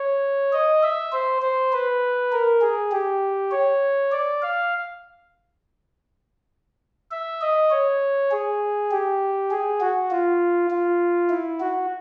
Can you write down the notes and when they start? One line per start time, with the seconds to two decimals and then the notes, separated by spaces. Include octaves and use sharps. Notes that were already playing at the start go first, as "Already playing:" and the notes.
Already playing: C#5
0.53 D#5
0.83 E5
1.12 C5
1.42 C5
1.73 B4
2.32 A#4
2.62 G#4
2.91 G4
3.51 C#5
4.12 D5
4.42 F5
7.11 E5
7.41 D#5
7.70 C#5
8.31 G#4
8.91 G4
9.51 G#4
9.80 F#4
10.11 F4
10.70 F4
11.30 E4
11.60 F#4